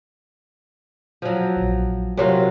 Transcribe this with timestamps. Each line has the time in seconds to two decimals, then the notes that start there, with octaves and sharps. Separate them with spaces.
1.22 F3 F#3
1.56 A#1
2.17 C3 F#3 F4 A#4 C#5